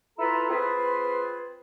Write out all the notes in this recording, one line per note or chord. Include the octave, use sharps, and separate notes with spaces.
E4 F4 A4 B4 A#5
C4 F4 G#4 B4